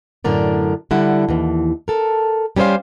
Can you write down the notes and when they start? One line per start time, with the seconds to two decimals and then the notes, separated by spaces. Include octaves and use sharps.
0.24 F#2 A2 D3 A#4 D5
0.91 D3 G3 E4 F#5
1.29 D#2 E3
1.88 A4 A#4
2.57 G3 C#4 A#4 C5 F5